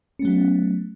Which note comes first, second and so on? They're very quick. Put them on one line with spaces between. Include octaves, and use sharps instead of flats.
C#4 A3 F#3 B3